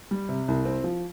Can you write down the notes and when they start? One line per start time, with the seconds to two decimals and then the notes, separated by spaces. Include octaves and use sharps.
0.11 G3
0.29 C3
0.48 C2
0.65 C4
0.84 F3